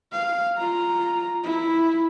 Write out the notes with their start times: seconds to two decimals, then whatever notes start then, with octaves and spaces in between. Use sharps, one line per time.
0.12 F5
0.57 F4 A#5
1.44 E4